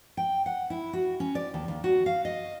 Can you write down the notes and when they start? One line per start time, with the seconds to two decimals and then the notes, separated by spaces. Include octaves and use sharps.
0.17 G5
0.46 F#5
0.70 E4
0.93 F#4
1.20 C#4
1.35 D5
1.54 D#2
1.68 D#2
1.84 F#4
2.06 F5
2.25 D#5